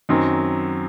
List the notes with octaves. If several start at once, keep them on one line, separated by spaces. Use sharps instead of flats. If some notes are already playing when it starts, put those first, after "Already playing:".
F#2 D#3 F#3 C4